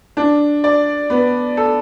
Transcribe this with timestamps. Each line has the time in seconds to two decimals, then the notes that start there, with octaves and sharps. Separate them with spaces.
0.17 D4
0.64 D5
1.10 B3
1.57 A4